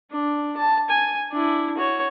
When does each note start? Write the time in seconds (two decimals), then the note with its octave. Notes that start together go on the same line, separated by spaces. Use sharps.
0.11 D4
0.57 A5
0.90 G#5
1.32 D4 E4
1.77 F#4 C#5